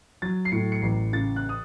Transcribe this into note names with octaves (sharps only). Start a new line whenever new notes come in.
F#3 A6
C7
A2 C#7
C#7
A1 C7
C#3 A6
F#6
D#6